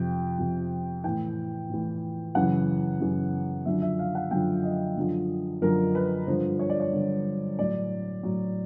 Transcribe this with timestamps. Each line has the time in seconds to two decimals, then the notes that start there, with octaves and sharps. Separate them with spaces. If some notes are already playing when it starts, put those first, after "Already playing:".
Already playing: F2 C3 F3 G5
0.38 F2 C3 F3
1.04 A2 E3 G5
1.70 A2 E3
2.35 F#2 C#3 E3 F#5
3.01 F#2 C#3 E3
3.66 F#2 D3 F3 E5
3.82 E5
3.99 F5
4.15 F#5
4.31 F#2 D3 F3 G5
4.63 D#5
4.97 F#2 D3 F3
5.61 F#2 D3 F3 A#4
5.95 B4
6.27 G2 D3 F3 C5
6.59 C#5
6.70 D5
6.80 C#5
6.92 G2 D3 F3
7.58 A2 F#3 D5
8.23 A2 F#3